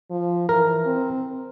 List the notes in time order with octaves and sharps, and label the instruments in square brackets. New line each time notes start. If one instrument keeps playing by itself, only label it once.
[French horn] F3
[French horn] E3 [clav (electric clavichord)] A#4
[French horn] C4